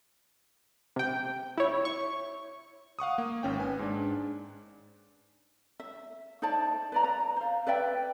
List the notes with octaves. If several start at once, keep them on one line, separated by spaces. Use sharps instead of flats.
C3 G5
E4 C#5
C#6
F5 F#5 C#6 D#6
A#3
G#1 C#4 G5
B4 G#5
G#2 D4
E5
D#4 C5 D5 A5
B4 D5 A#5
A#5
C5 F5
B4 D5 E5 G5